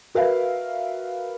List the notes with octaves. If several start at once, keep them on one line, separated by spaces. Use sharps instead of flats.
F#4 A#4 B4 E5 F5